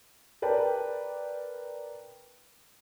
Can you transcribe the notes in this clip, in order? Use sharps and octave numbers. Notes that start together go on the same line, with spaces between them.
A#4 B4 D5 G5 A5